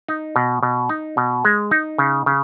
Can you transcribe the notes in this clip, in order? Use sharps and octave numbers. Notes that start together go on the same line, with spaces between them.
D#4
B2
B2
D#4
B2
G#3
D#4
C#3
C#3